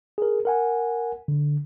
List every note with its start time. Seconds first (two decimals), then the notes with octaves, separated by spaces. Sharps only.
0.18 G#4 A#4
0.45 A#4 F#5 G#5
1.28 D3